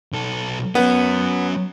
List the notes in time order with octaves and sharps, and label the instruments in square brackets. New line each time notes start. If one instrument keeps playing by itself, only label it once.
[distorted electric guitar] B1 A4
[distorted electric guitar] F#3 C#4 [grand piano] B3